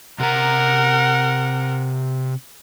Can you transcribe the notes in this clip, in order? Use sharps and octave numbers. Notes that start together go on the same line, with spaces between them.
C3 A#4 F#5 A#5